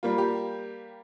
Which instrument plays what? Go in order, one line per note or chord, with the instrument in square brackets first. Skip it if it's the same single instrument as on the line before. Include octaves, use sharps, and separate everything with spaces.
[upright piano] G3 A#3 F4
G4